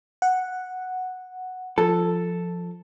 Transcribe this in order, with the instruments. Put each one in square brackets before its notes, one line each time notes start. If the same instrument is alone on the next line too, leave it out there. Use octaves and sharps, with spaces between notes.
[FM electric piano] F#5
[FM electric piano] F3 [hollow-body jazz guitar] A4